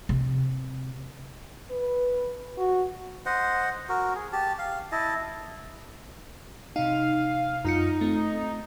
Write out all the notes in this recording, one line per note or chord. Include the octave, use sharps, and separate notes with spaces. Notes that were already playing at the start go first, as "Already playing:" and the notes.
C3
B4
F#4
C5 D#5 F#5
F#4 A#4
G#4
G4 A5
F5
E4 D#5 A5
C3 D#4 F5
F#2 D#4 F4 C#7
A3 C4